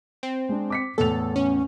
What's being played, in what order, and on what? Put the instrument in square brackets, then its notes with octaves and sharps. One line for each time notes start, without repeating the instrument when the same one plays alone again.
[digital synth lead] C4
[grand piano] G#3 D4
D6 B6 C#7
[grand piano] E2 A2 F7 [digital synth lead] A4
[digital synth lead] C#4